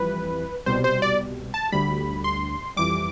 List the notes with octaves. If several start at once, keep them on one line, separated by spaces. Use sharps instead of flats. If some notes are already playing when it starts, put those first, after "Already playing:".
Already playing: F2 E3 G3 B4
C2 B2 G3 C5
C5
D5
A5
D2 D3 G3 B5
C6
F2 E3 G3 D6